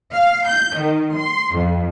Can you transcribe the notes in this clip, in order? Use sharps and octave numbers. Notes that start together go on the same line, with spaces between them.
F5
G6
D#3
C6
F2